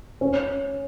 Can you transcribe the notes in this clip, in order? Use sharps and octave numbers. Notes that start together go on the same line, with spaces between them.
C#4